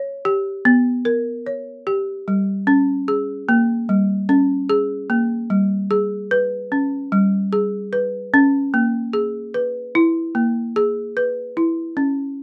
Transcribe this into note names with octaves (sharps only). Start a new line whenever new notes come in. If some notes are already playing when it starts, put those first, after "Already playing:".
Already playing: C#5
G4
B3
A#4
C#5
G4
G3
C#4
G#4
A#3
G3
C#4
G#4
A#3
G3
G#4
B4
C#4
G3
G#4
B4
C#4
A#3
G#4
B4
E4
A#3
G#4
B4
E4
C#4